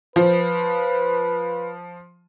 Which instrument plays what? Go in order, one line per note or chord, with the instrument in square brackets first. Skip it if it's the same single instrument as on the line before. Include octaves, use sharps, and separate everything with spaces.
[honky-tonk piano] F3 [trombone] B4